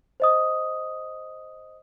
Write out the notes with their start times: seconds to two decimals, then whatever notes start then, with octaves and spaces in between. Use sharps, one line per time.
0.20 C5 D#5 D#6